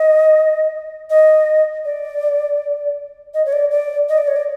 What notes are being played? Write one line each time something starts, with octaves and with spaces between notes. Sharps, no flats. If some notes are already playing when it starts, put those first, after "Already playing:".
Already playing: D#5
D#5
D5
D#5
C#5
D5
D5
D#5
D5
C#5
D5